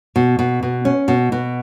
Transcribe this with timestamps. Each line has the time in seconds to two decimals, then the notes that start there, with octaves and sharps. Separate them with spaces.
0.16 B2
0.39 B2
0.63 B2
0.85 C#4
1.08 B2
1.32 B2